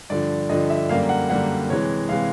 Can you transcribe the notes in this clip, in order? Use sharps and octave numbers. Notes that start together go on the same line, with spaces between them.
G2 D3 F3 D5
G2 D3 F3 D#5
E5
F#2 D3 G3 A#3 F5
F#5
F#2 D3 G3 A#3 F#5
C3 E3 G#3 C#5
C3 E3 G#3 F5